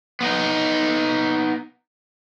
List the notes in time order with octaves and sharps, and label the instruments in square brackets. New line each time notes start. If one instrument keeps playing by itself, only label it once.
[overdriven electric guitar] B3 D#4